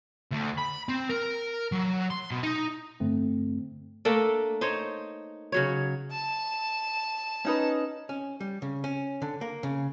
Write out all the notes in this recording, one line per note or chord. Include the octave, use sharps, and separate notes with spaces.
D2
B5
C4
A#4
F#3
C6
B2
D#4
G2 D3 A3 C4
A3 A#3 D4 A4
D#4 C5 C#5
C#3 F#3 C#5
A5 E7
C#4 D#4 B4
C#4
G3
C#3
C#4
D3
A#3
C#3